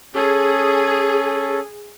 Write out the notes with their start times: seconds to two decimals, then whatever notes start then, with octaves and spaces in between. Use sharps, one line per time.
0.15 C#4 G#4 A4